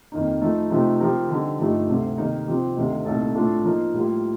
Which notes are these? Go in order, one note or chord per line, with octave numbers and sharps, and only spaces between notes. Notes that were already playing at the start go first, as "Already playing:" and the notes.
F2 D#3 A#3 D#4
F3 A3 D#4 A4
C3 F3 A3 C4 D#4
C3 F3 C4 G4 A#4
D3 G3 C4 D#4
G2 F3 A3 D#4 G4
D2 C3 G3
C3 D#3 A#3 D#4
C3 F3 C4 G4
D2 C3 D#3
C2 A#2 A3 D#4 A4
A2 A3 D4 F4 A4
F3 A#3 D#4 A#4
A2 G3 A#3 F4